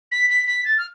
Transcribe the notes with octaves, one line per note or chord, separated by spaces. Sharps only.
B6
B6
B6
A6
F6